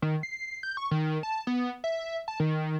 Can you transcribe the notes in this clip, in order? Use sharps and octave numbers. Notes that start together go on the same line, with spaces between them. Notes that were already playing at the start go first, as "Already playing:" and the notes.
D#3
C7
G6
C#6
D#3
A5
B3
E5
A5
D#3